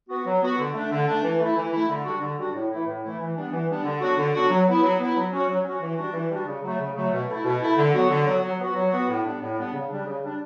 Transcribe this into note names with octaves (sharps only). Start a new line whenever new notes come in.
B3 F#4
F#3
B3 F#4
D3
A3 D4
D3
A3 D4
E3
A3 E4
E3
A3 E4
D3
G3 D4 F#4
D3
G3 D4 F#4
A2
E3 A3 E4
A2
E3 A3 E4
E3
G3 B3 D4
E3
G3 B3 D4
D3
F#3 B3 D4 F#4
D3
F#3 B3 D4 F#4
F#3
B3 E4
F#3
B3 E4
F#3
C#4 F#4
F#3
C#4 F#4
E3
G3 D4 F#4
E3
G3 D4 F#4
C#3
F#3 A3
C#3
F#3 A3
B2
A3 E4
B2
A3 E4
D3
F#3 B3 F#4
D3
F#3 B3 F#4
F#3
B3 F#4
F#3
B3 F#4
A2
G3 B3 D4
A2
G3 B3 D4
C#3
G3 D4
C#3
G3 D4